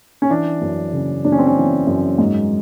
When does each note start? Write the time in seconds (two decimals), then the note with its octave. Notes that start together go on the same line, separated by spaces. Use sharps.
0.22 C#4
0.30 E3 D4
0.61 F#2
0.93 C#3
1.24 F#2 D4
1.32 C#4
1.39 C4
1.47 C#4
1.57 E3
1.87 F#2
2.18 G#2